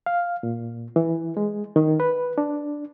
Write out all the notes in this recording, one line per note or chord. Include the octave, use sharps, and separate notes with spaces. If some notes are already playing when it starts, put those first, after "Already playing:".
F5
A#2
E3
G#3
D#3
B4
D4